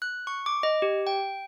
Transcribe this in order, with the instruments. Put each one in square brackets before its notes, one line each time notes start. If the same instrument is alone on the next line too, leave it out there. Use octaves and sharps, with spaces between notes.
[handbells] F#6
C#6
D6
D#5
G4
G5